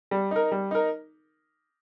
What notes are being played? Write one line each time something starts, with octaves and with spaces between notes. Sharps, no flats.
G3
D#4 A#4
G3
D#4 A#4